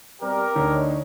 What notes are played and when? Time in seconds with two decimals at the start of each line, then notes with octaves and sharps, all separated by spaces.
0.21 B2 G3 C4 G4 A#4
0.56 D2 D4 D#4 C#5